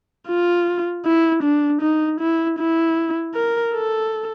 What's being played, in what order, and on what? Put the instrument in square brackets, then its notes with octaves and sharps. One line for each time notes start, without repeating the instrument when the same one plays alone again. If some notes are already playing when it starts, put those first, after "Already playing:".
[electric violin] F4
E4
D4
D#4
E4
E4
A#4
A4